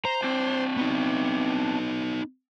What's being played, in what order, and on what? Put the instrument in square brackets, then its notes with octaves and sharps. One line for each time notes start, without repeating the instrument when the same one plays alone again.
[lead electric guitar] C5 [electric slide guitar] A#5
[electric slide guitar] C4 D4
[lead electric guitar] B3 D#4